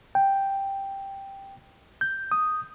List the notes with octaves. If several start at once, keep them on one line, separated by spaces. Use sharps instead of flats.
G5
G6
D#6